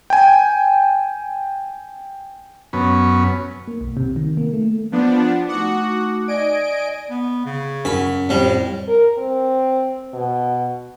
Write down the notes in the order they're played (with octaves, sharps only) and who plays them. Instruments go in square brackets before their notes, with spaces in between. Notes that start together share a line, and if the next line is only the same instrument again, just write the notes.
[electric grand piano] G5 G#5
[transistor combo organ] F#2 B3 C#4
[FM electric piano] A#3
B1
C3
D#3
A#3
A3
[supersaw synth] F3 B3 D4
[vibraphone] A3 D#4 D6 [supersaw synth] F#4 F#5
[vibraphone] D5 [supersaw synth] D#5 G#5 D7
[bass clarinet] B3
C#3
[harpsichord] F#2 B5
[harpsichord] F2 G3 [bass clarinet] A2
[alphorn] A#4
C4
B2